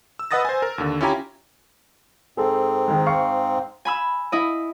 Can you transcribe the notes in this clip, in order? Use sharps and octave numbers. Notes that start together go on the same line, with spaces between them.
E6
B4 D#5 F#5 D#6 A6 A#6
C5 G#5
A#4
D#2 D3
C#4 E4 F4 G4 G#5 A#5
G#2 C4 G#4 A4
D#3 G#3
F5 C#6
G#5 B5 E6
E4 D#5